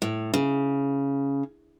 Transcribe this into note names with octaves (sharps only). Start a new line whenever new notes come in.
A2
C#3